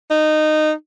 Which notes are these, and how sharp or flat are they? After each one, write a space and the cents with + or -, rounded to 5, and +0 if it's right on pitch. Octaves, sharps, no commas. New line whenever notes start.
D#4 -15